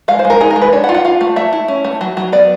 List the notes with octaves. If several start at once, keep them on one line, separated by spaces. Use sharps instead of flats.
G#3 F5
C5
G#3
A#4
D#4 G#4
A#4
G#3
B4
D4 C#5
F#5
F4
F#5
F4 F5
A3
A3 E5
E4
C#4
A3
F#3
F#3
B3 D5